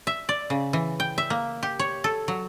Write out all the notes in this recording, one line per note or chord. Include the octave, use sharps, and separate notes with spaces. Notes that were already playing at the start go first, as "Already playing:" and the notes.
E5
D5
C#3
E3
G5
E5
A#3
G4
C#5
A4
F#3